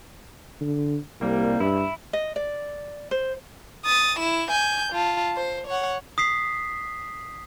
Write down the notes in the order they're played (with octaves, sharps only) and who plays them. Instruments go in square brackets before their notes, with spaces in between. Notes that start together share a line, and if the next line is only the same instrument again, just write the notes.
[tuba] D3
[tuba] C2 [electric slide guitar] G3 A#3
[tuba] G2 [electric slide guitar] E4
[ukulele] D#5
D5
C5
[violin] D#6 A6
E4 E7
G#5 G6
F4 A5
C5
C#5 F#5
[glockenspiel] D#6 B6 C7